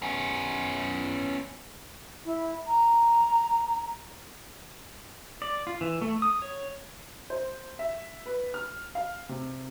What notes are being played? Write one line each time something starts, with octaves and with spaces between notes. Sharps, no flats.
B3 C#4
E4
A#5
D5
F4
E3
A3
D#6
C#5
C5
E5
B4
F6
F5
C3